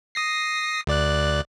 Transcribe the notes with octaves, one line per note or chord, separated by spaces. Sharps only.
D#6 A#6 C7
D2 D5 F#6